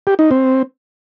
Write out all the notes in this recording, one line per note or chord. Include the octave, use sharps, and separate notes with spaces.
G4
D#4
C4